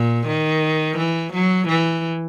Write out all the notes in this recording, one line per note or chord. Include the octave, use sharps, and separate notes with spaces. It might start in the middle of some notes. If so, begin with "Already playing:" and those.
Already playing: A#2
D#3
E3
F#3
E3